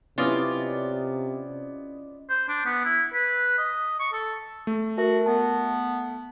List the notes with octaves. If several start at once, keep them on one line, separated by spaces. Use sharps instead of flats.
C3 B3 C#4 E4 F4 D5 D#5
C5
D4
B3
E4
B4
D#5
C#6
A4
A3
F#4 A#4 E5 A5
B3 A5